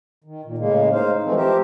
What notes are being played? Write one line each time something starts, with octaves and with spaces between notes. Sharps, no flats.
D#3
A#2
A2 C#3 G#3 A#3
D#4 C5 F5
E3 F3 G#3 A3 C4
F3 G4 A#4 C5 E5